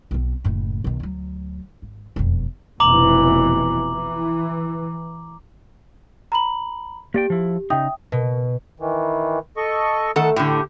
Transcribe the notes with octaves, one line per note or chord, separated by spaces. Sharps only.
B1 C4
F#1 A2
B1 D#3
D2 F#3
G#1
E1 F2
F1 B2 E3 A#5 D6 F#7
E3
A#5 B5 F#7
A#3 G4 D5 G5
F3 E4
C#3 D#4 E5 G5 D#6
B2
D#3 E3
A4 D#5 C#6
D#3 A3 A4 F#5
A2 D3 G4